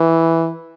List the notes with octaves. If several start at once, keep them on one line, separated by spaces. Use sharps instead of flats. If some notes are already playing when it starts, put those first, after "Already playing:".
Already playing: E3